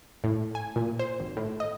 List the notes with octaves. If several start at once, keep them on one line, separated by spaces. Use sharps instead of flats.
A2
G#5
A#2
C5
G#1
A2
D#5